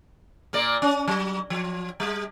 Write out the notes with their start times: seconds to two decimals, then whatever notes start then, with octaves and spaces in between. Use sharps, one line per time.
0.53 A#2 A#3 D5
0.82 C#4
1.08 F#3
1.50 F3
2.00 G3